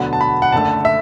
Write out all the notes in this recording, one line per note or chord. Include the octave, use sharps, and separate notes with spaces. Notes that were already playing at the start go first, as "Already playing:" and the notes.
Already playing: E1 D2 D3 F#3 B3
A5
B5
F#5
F#1 F#2 D3 A3 A5
E5